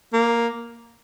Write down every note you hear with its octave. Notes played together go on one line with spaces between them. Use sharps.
A#3